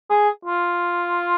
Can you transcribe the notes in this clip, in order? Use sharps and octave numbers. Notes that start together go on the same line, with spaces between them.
G#4
F4